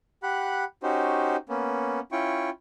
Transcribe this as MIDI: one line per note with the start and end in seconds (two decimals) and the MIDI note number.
0.23 0.64 67
0.23 0.64 78
0.23 0.64 83
0.23 0.64 90
0.83 1.36 61
0.83 1.36 63
0.83 1.36 66
0.83 1.36 67
0.83 1.36 72
1.49 2.00 58
1.49 2.00 59
1.49 2.00 61
2.12 2.50 61
2.12 2.50 64
2.12 2.50 65
2.12 2.50 79
2.12 2.50 85